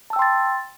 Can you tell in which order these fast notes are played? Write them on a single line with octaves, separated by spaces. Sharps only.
A5 E6 G5 C6 A6